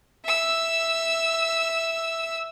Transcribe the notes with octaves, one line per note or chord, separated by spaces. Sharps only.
E5 E6